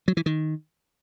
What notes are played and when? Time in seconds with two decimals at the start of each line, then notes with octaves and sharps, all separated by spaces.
0.08 F#3
0.17 E3
0.26 D#3